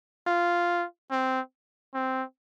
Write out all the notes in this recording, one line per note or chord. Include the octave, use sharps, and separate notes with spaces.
F4
C4
C4